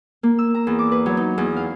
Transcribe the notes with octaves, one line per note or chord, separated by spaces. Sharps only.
A#3
E6
A#5
E2
D6
B4
F#3
D#4
E2
F5